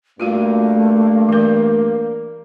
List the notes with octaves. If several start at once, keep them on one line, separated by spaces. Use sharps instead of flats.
G2 A3 A#3 F4 F#4 F5
E3 A#4